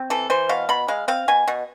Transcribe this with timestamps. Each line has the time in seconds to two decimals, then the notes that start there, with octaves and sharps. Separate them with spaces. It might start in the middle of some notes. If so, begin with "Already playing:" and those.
Already playing: C4
0.10 E3 A4
0.30 E3 C5
0.49 B2 F5
0.69 B2 B5
0.88 G#3 F5
1.08 C4 F5
1.28 B2 G#5
1.48 B2